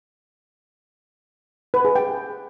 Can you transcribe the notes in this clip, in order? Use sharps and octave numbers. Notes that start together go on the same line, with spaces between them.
B4
G#4
G5